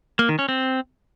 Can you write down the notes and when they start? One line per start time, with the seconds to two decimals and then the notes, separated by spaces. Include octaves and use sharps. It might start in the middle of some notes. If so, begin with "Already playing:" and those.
0.19 A#3
0.29 D#3
0.39 C#4
0.49 C4